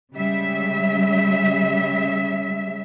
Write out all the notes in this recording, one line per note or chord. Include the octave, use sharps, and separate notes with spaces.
C#3 G3 G#3 E5